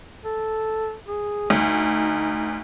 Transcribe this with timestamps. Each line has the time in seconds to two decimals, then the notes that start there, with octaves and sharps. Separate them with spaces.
0.24 A4
1.07 G#4
1.50 D2 D#4